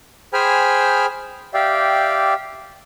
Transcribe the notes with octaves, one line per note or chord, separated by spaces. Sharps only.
G#4 C5 G5 G#5 B5 F6
G4 D5 E5 F5 G5